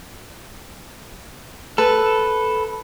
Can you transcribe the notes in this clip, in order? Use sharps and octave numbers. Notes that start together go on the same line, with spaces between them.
A4 B4